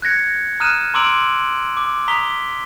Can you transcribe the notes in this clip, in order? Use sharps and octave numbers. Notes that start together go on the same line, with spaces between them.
F#6 G#6 A#6 C#7
A#5 D#6 F6 F#6 D#7 E7
A#5 C6 D6 E6 D7 F#7
D6
A#5 D#6 B6 G7